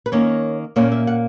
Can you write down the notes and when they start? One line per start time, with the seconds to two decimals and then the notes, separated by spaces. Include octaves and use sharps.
0.06 B4
0.12 D#3 A#3 C#4 C#5
0.76 A#2 A#3 C#4 C#5
0.92 E5
1.07 F#5